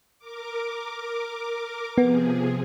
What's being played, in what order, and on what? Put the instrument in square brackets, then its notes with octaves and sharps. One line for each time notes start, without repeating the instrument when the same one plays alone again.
[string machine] A#4 D6
[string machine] C3 F3 G#4 [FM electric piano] B3